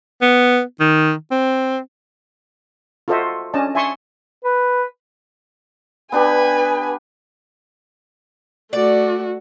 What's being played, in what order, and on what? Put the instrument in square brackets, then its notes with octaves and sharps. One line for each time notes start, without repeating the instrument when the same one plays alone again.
[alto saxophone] B3
D#3
C4
[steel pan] F4 F#4 A4 C5 D#5 E5
C#4 D4 D#5 A5
E5 G#5 A5 C6 C#6 D#6
[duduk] B4
[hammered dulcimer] B3 D4 G4 [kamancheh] B4 G#5
[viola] A3 F#4 [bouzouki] D5